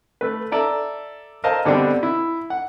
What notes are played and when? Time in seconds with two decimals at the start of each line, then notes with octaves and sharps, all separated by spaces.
0.21 A3 B4
0.52 A4 D5 E5 A#5
1.44 A4 A#4 C5 D#5 F5 A5
1.65 B2 D3 G3 C4 D4
2.03 E4
2.50 F#5